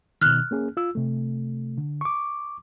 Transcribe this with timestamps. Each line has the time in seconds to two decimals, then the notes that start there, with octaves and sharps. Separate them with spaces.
0.21 B2 D#3 F6 F#6
0.51 A#3 C#4 G#4
0.77 F4 E6
0.95 C3 A3
1.78 D3
2.01 C#6 D6